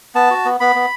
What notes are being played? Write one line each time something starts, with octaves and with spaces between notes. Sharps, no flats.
B3 A5
F#4
B3
B3 B5
B3